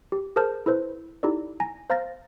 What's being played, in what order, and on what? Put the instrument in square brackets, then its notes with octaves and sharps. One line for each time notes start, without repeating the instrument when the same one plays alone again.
[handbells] G4
G#4 A#4 C5 A5 F6 G6
E4 A4 B4 C5
D#4 E4 G4 A4 D5
G#5 A#5 A#6
C5 F5 A#5 F6 A6 A#6